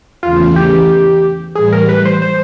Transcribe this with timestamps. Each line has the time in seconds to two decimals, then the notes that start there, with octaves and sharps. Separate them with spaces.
0.23 E2 C#3 E3 A3 F4
0.56 G4
1.55 A2 E3 G3 G#4
1.72 A#4
1.89 B4
2.05 C5
2.22 C5